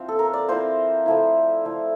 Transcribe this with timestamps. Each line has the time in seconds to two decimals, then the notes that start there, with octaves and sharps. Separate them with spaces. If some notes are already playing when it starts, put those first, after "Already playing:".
Already playing: F3 C4 E4
0.08 A4
0.19 A#4
0.34 D5
0.48 F3 C4 E4 C5
1.06 F3 A3 E4
1.65 F3 A3 E4